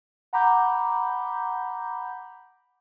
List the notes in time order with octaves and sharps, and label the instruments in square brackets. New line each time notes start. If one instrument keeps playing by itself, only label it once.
[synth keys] F#5 A#5 B5 D6 G6